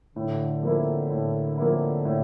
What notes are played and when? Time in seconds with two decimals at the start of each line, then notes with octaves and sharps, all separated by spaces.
0.16 A2 D3
0.63 F3 A#3 E4
1.10 A2
1.58 F3 A#3 E4
2.05 A2